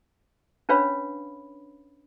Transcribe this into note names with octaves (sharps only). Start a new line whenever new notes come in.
C#4 D4 B4 C#5 F5 B5